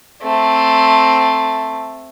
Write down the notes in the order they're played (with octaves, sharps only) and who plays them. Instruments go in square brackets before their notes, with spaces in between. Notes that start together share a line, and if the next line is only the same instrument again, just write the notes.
[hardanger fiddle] A3 C4